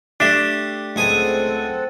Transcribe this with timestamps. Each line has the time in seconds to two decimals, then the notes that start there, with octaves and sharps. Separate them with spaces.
0.20 A3 D4 G4 E5
0.96 C#2 A3 C4 G#4 A4 F#5 G#5